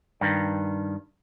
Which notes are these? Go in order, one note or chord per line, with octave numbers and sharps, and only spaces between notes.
G2 D#3